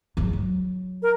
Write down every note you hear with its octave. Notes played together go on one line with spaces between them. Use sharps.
F3 G#3
F#3
A#4